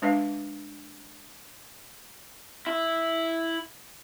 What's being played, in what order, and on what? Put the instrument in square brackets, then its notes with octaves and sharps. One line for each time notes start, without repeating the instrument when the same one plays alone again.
[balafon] G#3 D4 B4 E5 F5
[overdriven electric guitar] E4